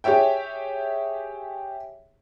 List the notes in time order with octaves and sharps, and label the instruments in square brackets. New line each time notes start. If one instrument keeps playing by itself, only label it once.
[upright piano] G4 G#4 C#5 E5 G5